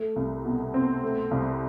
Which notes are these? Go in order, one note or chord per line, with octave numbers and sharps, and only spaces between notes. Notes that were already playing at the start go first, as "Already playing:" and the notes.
Already playing: A3
C2
B2
C4
A3
C2